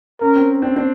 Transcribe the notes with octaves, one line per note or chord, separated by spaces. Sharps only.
C#4 A#4
C4
C4 D4
C4 D4